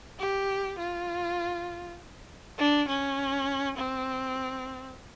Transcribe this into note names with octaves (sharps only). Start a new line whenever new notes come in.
G4
F4
D4
C#4
C4